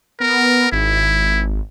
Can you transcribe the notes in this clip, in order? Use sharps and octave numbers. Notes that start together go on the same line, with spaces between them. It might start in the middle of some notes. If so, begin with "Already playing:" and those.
B3 A#4
G#1 E4